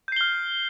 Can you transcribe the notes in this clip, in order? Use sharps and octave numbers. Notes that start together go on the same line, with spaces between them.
F6 G6 C7 G7